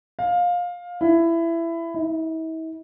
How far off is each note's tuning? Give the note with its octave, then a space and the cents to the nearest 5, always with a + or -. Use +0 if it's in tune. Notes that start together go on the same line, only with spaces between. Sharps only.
F5 +20
E4 +15
E4 -45